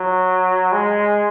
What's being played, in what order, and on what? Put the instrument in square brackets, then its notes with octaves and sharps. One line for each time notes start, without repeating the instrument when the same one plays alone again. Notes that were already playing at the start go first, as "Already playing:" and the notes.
Already playing: [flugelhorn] F#3
G#3